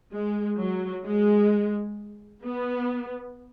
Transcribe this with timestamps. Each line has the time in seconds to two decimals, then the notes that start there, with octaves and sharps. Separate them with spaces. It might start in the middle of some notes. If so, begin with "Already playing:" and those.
0.11 G#3
0.57 F#3
1.04 G#3
2.44 B3